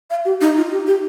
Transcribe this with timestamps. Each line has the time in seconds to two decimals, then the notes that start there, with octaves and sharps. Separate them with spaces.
0.10 F5
0.25 G4
0.41 D#4
0.57 F4
0.71 G4
0.87 G4